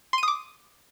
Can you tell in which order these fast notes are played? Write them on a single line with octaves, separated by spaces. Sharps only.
C6 D#7 D#6 D6